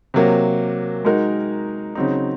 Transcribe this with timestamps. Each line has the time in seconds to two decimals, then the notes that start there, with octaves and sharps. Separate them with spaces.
0.14 C3 F#3 A#3
1.05 G#3 D#4 F#4 A#4
1.95 C#3 F#3 C4 D#4